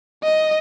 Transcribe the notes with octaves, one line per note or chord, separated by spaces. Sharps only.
D#5